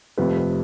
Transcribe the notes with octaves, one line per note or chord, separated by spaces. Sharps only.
F1 F2 C3 G3 B4
B4